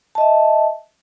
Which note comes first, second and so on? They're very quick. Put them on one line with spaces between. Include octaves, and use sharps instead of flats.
A5 D#5 E5